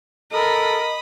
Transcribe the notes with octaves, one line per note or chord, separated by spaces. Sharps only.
A4 A#4 D#5 B5 D#6